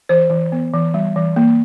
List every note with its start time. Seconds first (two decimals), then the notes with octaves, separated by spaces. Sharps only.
0.09 E3 C5
0.30 E3
0.52 B3
0.73 E3
0.94 G3
1.16 E3
1.36 A#3